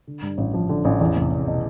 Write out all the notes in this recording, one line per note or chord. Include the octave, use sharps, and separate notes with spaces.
D3
G2
A1
F3
D3
A1
E2
F1
F1
B2